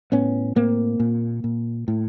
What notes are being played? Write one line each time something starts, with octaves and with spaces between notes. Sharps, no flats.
A2 B3 C#4
A2 A#3 C4
A#2
A#2
A2